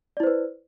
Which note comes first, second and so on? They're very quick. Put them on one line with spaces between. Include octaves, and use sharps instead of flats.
D5 E4 C5 B4